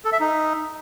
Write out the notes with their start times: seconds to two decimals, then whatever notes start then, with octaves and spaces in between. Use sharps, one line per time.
0.05 A4
0.12 E5
0.20 D#4